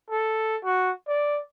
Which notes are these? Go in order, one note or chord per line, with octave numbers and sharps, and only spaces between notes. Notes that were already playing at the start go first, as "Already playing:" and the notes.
A4
F#4
D5